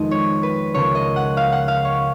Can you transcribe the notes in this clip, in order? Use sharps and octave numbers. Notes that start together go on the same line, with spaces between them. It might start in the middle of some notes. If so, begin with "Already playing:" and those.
Already playing: F2 D#3 G#3 B3 D#5
C#5
B4
C#2 C#3 F3 A#3 C#5
D#5
F#5
F5
F#5
F5
C#5